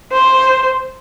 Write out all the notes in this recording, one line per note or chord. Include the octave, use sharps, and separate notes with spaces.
C5